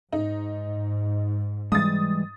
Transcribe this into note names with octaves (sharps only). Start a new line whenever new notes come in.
G#2 D#4
E3 G3 G#3 D#6 A6